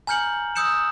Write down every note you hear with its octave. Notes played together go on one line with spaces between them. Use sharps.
G#5 A#5 F6 G6 C#7 F#7
D#6 E6 G6 C#7 E7